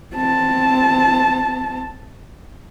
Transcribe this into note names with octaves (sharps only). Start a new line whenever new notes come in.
C4 A5